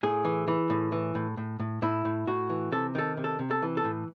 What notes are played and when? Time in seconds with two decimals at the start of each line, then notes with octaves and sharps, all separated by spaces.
0.03 A2 G#4
0.25 E3
0.48 E3
0.70 A2
0.92 E3
1.15 A2
1.37 A2
1.60 A2
1.82 A2 E4
2.05 A2
2.27 A2 F#4
2.50 E3
2.72 C3 A4
2.95 D#3 A4
3.17 C3
3.24 A4
3.39 C3
3.51 A4
3.62 E3
3.77 A4
3.84 A2